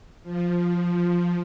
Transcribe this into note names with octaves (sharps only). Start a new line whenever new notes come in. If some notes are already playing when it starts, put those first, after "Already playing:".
F3